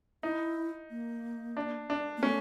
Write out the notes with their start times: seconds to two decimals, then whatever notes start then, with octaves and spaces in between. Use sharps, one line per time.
0.23 D#4 E4
0.90 A#3
1.57 D4
1.90 D4
2.17 A#3
2.22 A3 C#4